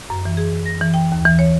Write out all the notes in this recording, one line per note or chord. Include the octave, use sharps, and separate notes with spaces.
F#2
E3
G#4
A#6
E3
G5
D#2
E3
C#5